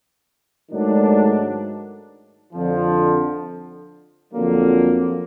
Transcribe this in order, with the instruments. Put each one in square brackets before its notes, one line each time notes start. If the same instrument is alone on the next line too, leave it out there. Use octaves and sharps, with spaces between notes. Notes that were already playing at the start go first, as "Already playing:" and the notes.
[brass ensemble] G#2 D#3 F#3 A3 D4
F2 D3 F3
F2 D3 F#3 A#3